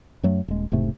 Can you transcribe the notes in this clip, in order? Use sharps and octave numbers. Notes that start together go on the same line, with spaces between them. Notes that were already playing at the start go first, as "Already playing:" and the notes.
F#2 F#3 A3
D#1 G#3
E1 G#2 C3 A3